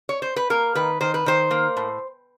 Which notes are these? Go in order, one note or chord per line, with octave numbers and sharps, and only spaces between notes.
C#5
C5
B4
A#3 A#4
D#3 B4
D#3 C5
B4
D#3 C5
A#3
A2